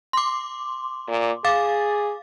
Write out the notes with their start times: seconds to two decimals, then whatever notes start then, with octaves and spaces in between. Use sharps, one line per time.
0.13 C6 D6
1.08 A#2
1.44 G#4 F5 D6 A6